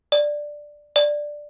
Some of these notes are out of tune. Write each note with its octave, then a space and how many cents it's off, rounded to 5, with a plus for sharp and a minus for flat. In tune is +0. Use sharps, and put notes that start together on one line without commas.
D5 +5
D5 +5